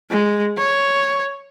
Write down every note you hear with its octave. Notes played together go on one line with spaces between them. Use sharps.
G#3
C#5